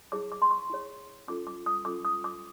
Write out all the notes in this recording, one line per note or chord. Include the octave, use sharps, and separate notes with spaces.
E4 G#4 C#5 D6
D6
C6
C#6
E4 G#4 C#5
C#4 F4 A4 D6
D6
D#6
C#4 F4 A4 D6
D#6
D6